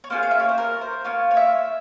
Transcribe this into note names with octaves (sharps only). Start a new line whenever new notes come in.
C#5
A#3 C#4 F4 G#4 C5
F5
E5
C#5
C5
A#4
C5
A#3 C#4 F4 C#5
C#5
E5